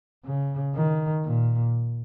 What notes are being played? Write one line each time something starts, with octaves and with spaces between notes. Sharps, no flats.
C#3
D#3
A#2